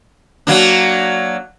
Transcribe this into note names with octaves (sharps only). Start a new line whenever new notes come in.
F#3 A#3 D4